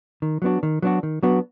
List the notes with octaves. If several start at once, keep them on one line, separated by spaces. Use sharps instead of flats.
D#3
F#3 B3 D4 F#4
D#3
F#3 B3 D4 F#4
D#3
F#3 B3 D4 F#4